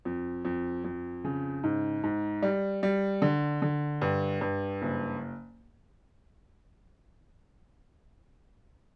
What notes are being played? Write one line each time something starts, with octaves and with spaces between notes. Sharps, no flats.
F2
F2
F2
C#3
G#2
G#2
G3
G3
D3
D3
G2
G2
F#1